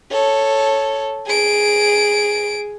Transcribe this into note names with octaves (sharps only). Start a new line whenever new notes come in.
A4 C#5
G#4 D7